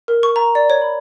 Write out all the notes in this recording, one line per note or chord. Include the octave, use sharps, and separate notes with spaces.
A#4
C#6
A#5
D5
C#5
B5